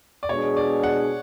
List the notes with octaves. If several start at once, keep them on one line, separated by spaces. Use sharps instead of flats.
D5
B2 G#3 D4 G#4 C#5
D5
F#5